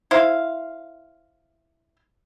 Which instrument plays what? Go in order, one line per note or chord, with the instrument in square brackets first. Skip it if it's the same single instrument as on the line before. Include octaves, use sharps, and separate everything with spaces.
[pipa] E4 C5 F5